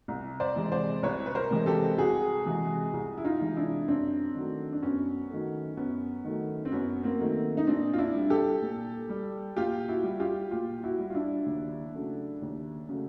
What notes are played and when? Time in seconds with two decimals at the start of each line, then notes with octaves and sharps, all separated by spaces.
0.08 C2
0.40 C5 D5
0.56 C3 E3 G#3
0.72 C5 D5
1.03 C2 B4 C#5
1.26 B4
1.35 A#4 C5
1.51 C3 E3 G#3
1.66 G4 A4
1.97 C2 F#4 G#4
2.45 C3 E3 G#3
2.94 C2
3.18 E4
3.25 D#4 F4
3.40 C3 E3 G#3
3.56 D4 E4
3.88 F#2 C4 D4
4.35 D#3 F#3 A3
4.73 D4
4.82 F#2 B3 C#4
5.30 D#3 F#3 A3
5.77 F#2 B3 C#4
6.24 D#3 F#3 A3
6.65 C4
6.72 F#2 B3 C#4
7.03 A#3 C4
7.19 D#3 F#3 A3
7.57 D#4
7.67 A#2 C4 D4
7.93 F4
7.98 D4 E4
8.15 G3
8.30 G4 A4
8.61 A#2
9.09 G3
9.57 A#2 F4 G4
9.88 E4 F#4
10.03 G3
10.20 F4 G4
10.51 A#2 F4 G4
10.83 E4 F#4
10.99 G3
11.10 F4
11.15 D4 E4
11.46 D#2
11.94 C#3 F#3 A3
12.42 D#2
12.89 C#3 F#3 A3